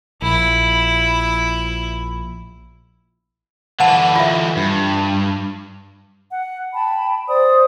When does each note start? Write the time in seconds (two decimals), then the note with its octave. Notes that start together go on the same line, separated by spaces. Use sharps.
0.22 A#1 E4
3.80 D3 E3 F#5 A5
4.16 F4 E5
4.57 G2
6.30 F#5
6.73 G5 A5 B5
7.28 C5 D5 D#6